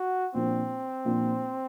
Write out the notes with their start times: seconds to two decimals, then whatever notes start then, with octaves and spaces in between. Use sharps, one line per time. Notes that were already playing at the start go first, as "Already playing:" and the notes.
Already playing: F#4
0.34 A#2 F3 A#3 C4 D4
1.05 A#2 F3 A#3 D4